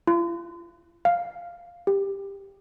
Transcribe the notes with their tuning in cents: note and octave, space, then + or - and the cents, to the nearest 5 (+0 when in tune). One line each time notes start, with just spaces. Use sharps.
F4 -40
F5 +0
G4 +10